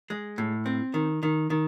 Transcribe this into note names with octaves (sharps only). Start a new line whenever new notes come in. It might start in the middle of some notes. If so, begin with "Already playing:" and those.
G#3
A2
C4
D#3
D#3
D#3